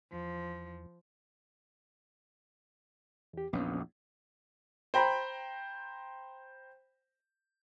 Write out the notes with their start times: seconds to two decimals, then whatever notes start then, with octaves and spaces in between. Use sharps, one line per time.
0.13 E2 F3
3.33 E2 G4
3.53 A#1 E2 B3 C#4
4.94 C5 G5 A#5 B5